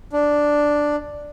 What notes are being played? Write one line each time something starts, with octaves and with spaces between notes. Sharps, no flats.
D4